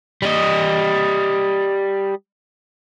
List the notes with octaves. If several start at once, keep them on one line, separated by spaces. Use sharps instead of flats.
G3 D#5